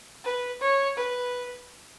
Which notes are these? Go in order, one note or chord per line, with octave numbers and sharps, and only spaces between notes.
B4
C#5
B4